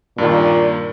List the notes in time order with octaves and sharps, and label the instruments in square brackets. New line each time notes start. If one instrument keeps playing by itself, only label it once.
[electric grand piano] G2 D#3 [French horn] A#2